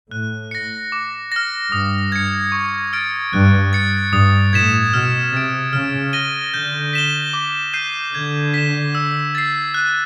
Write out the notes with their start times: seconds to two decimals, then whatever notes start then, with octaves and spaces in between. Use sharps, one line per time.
0.11 A2 F#6
0.51 A#6 C#7
0.92 D6
1.32 F6 A#6
1.72 G2 D#6
2.12 G#6 C#7
2.52 C#6
2.93 F6 A6 D7
3.33 G2 F#6
3.73 A6 C#7
4.13 G2 D#6
4.53 A2 G#6 B6 E7
4.93 B2 F6
5.33 C3 A6 D7
5.73 C#3 F6
6.13 A#6 D#7 G7
6.53 D3 G6
6.93 B6 E7 G7
7.33 D6
7.73 G6 C7 D#7
8.14 D3 G#6
8.54 B6 E7
8.95 E6
9.35 A6 C7
9.74 F#6